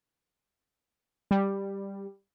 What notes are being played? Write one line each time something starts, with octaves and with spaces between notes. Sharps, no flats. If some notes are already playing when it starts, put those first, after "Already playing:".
G3